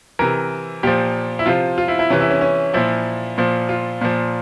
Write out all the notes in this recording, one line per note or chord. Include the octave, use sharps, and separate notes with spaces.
C3 E3 A#4
A#2 F3 G4
E4
C3 F3 F4
F4
E4
E4
C3 E3 C#4
E4
C#4
C#4
A#2 F3 E4
A#2 F3
F4
A#2 F3